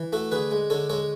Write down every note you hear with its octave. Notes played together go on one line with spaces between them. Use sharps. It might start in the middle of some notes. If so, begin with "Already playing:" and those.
Already playing: E3
A3 F#4 A4
D3 G#4 B4
G#3
D3 A4 C#5
G#3 A4 C#5